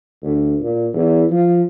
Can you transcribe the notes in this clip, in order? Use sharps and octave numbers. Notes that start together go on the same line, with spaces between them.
D2
A#2
E2
F3